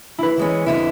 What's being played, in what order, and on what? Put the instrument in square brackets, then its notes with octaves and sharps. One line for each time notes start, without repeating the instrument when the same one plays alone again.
[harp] E4 B4
[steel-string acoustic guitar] E3 G#3 C#4
F2 D3 E4